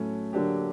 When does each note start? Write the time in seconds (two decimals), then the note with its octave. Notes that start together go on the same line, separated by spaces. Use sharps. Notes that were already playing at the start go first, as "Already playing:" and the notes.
Already playing: A2 F#3 A3 C#4
0.33 D3 F#3 A#3 D4 G4